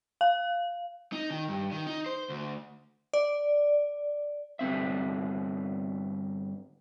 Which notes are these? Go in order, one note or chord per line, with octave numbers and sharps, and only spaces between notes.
F5
D#4
D#3
G2
D#3
D#4
C5
D2
D5
G2 D3 C4 E5